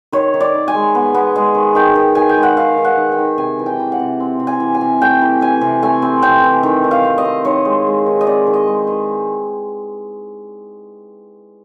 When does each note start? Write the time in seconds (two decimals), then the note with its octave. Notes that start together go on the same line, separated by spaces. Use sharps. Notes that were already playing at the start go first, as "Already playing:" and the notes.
0.12 D#3 C#5
0.34 D#3
0.40 D5
0.54 D#3
0.68 G#5
0.75 G#3
0.95 B3
1.14 B3
1.36 G#3
1.55 D#3
1.75 D#3 G5
1.95 D#3
2.15 D#3 G#5
2.29 G5
2.37 G#3
2.43 F#5
2.57 D#3 F5
2.77 D#3
2.84 F#5
2.97 D#3
3.12 G5
3.19 D#3
3.38 C3 G#5
3.59 E3
3.66 G5
3.80 E3
3.92 F#5
3.99 C3
4.20 C4
4.39 C3
4.47 G#5
4.60 E3
4.75 G#5
4.81 C3
5.02 A3 G5
5.22 E3
5.41 E3 G#5
5.61 C3
5.82 A3 G#5
6.02 C4
6.22 C3 G5
6.44 E3
6.63 D#3
6.84 D#3
6.91 F5
7.05 C4
7.18 D#5
7.25 C4
7.45 D#3 C#5
7.65 G#3
7.86 G#3
8.06 D#3
8.21 D#5
8.27 C4 D5
8.47 D#3
8.53 D#5
8.67 G#3
8.87 D#3